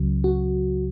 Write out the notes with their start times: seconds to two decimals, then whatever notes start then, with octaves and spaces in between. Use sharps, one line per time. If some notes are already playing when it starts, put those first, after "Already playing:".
Already playing: C#2 C#3 F#3
0.24 F#4